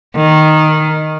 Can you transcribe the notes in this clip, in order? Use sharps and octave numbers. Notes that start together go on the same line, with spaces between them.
D#3